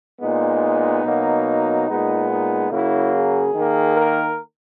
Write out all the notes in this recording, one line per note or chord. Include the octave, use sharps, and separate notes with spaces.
A#2 G#3 B3 D#4
B2 F#3 A#3
A#2 G#3 B3 D#4
D#4
C#3 F#3 A#3 E4
G#4
D#3 A#3
A#4